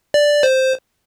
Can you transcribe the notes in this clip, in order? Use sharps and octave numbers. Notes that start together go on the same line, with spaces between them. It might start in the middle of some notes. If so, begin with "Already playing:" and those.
D5
C5